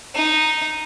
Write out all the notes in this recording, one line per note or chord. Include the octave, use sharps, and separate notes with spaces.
D#4